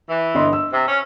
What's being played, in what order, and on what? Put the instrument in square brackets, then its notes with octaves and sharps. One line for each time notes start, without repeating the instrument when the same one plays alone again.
[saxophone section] E3
[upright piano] G1 D#5 C6
E6
[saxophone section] C3
C#4